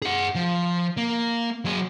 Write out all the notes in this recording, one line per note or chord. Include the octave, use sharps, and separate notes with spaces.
G#4 F#5
F3
A#3
F#3 G#4